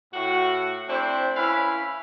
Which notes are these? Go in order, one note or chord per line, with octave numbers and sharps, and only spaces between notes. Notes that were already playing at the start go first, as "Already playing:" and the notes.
A2 F#4
A3 C4 D4 E4 C5
C#4 E4 B4 F5 G#5 B5